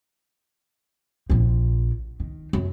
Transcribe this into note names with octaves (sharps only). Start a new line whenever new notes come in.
A#1 F3
D#3
F#2